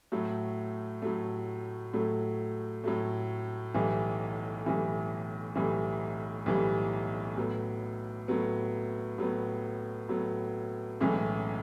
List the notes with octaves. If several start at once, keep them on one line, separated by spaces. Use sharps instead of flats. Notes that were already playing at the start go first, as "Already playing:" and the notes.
A2 F#3 A3
A2 F#3 A3
A2 F#3 A3
A2 F#3 A3
B1 A2 E3 G3
B1 A2 E3 G3
B1 A2 E3 G3
B1 A2 E3 G3
A2 F#3 B3
A2 F#3 B3
A2 F#3 B3
A2 F#3 B3
B1 A2 E3 G#3 C#4